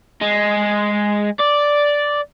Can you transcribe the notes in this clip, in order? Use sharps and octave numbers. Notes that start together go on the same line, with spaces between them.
G#3
D5